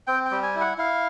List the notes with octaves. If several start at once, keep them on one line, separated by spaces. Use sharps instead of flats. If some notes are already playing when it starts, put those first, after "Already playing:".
C4 G5
G5
G3
G#5
E4
F#5
E4 F5